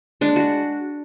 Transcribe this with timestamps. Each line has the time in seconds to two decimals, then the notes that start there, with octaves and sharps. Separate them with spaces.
0.21 G#3 D4
0.36 F#4